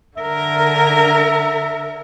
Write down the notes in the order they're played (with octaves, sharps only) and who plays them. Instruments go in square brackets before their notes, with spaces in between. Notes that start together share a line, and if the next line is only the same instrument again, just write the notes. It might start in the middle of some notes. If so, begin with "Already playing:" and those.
[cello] D3 A#4 [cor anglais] E5